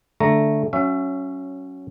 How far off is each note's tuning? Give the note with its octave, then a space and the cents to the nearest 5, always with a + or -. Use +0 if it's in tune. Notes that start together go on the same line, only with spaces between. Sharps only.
D3 +0 A3 +0 A#5 +0
F#3 +5 C#4 +0 E5 +30